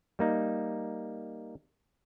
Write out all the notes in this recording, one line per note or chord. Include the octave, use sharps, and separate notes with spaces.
G3 A#3 D#4